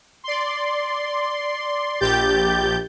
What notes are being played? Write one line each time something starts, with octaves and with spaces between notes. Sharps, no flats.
D5 C6
A#1 G4 G6 A6